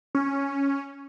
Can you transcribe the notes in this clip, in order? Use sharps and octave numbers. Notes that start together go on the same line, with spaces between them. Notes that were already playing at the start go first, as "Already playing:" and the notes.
C#4